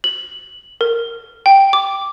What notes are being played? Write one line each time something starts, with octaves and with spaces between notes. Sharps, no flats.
F#7
A#4
G5
D6